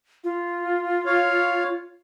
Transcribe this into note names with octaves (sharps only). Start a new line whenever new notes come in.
F4
C#5 F5